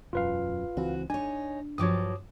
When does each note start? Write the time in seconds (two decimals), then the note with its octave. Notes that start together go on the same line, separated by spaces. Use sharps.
0.13 E1 F#2 F4 B4 F5
0.77 C#2 E3 C4 F#4
1.10 D4 D#4 C#5 G#5
1.78 G2 F3 F#3 C#5 D6 D#6